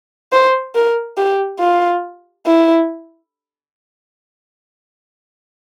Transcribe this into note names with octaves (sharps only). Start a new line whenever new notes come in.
C5
A#4
G4
F4
E4